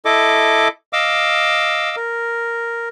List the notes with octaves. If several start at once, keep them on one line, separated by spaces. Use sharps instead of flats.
E4 A4 D#5 D6
D#5 F5 D6 E6
A#4